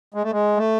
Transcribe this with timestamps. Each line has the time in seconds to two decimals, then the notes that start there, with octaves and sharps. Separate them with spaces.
0.14 G#3
0.23 A3
0.32 G#3
0.57 A3